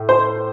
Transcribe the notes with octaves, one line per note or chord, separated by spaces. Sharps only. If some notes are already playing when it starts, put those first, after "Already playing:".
Already playing: A2
C5